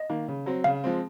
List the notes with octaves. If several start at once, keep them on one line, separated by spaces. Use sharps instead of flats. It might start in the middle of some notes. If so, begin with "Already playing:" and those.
Already playing: D#5
D#3 A#3
C#3
F#3 C4
C#3 F5
F3 G#3 C4